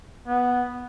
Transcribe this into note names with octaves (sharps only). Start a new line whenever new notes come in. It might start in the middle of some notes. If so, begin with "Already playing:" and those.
B3